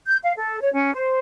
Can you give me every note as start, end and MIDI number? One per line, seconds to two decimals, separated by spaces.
0.06 0.17 91
0.22 0.32 77
0.36 0.59 69
0.61 0.71 73
0.73 0.92 61
0.94 1.19 72